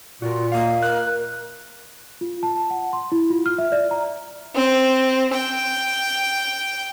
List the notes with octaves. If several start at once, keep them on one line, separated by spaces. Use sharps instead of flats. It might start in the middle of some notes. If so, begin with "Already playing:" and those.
A#2 F4 F#4 A#4
A#3 D#5 F5
A#4 F#6
F4
A5
F#5
C6
E4
F4
F6
E5
D5
A#5
C4
G5